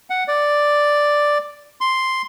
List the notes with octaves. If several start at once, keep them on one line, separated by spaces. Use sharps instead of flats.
F#5
D5
C6